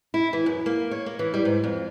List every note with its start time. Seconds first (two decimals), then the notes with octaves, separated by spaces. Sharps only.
0.14 E4
0.33 E3
0.46 F#2
0.66 A#3
0.91 C#5
1.06 A#3
1.19 E3
1.34 G3
1.45 G#2
1.64 F2